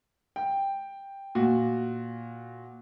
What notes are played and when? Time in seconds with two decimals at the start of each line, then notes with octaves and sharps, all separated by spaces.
0.36 G5
1.35 A#2 F#4